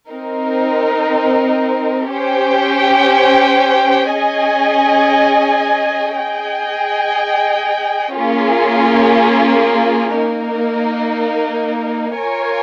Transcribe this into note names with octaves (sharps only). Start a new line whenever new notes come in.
C4 D#4 A#4
C#4 G4 C5 G5
C#4 G#4 D#5 G#5
G#4 D#5 G5
A#3 C#4 F4 G#4
A#3 D#4 A#4
F4 A#4 C#5 G#5